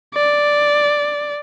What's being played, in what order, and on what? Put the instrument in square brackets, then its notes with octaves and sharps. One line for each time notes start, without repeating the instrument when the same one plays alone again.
[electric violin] D5